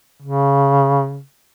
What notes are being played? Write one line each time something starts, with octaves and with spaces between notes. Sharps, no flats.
C#3